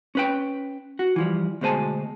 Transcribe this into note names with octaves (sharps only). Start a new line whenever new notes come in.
C#4 B4 G5
F#4
E3 F3 G3
D2 B2 G#3 C5 G#5 A5